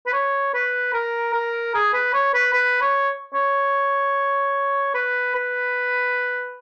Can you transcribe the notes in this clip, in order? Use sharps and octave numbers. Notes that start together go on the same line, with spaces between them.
B4
C#5
B4
A#4
A#4
G#4
B4
C#5
B4
B4
C#5
C#5
B4
B4